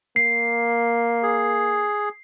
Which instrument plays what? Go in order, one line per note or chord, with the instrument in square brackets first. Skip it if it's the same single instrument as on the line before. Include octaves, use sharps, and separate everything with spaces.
[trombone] A#3 [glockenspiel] C7
[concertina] G#4